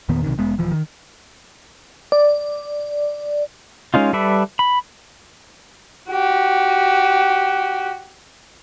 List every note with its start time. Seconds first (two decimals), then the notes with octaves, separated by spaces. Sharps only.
0.09 E2 A#2 D#3 B3
0.23 B1 C3 D#3
0.38 F1 G#3 B3
0.58 D#1 E3 F3
0.72 D#3
2.12 D5
3.94 G#3 C#4 D#4 F4
4.13 G3 A4 B4 D5 E5
4.59 B5
6.10 F#4 G4